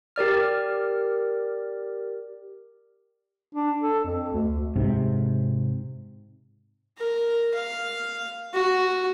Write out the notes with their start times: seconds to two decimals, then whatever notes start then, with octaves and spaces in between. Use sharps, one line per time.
0.16 G4 A#4 D5 F6
3.55 D4
3.81 A4
4.04 F2
4.33 D2
4.76 G#2 C3
6.98 A#4
7.54 F5
8.54 F#4